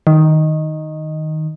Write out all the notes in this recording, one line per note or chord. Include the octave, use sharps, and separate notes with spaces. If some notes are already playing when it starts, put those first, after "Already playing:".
D#3